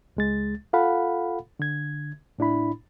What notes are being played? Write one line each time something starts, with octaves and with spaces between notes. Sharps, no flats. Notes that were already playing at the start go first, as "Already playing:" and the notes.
C#2 G#3 A6
F4 A4 F5 F#5 B5
D3 G#6
A2 D4 E4 B5